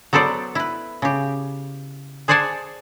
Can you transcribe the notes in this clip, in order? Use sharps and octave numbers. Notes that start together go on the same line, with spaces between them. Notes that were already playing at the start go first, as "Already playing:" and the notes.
F#3 B3 A4 C5 D5
E4 B4
C#3 G4
G#4 C5 D5 F#5 G#5 A5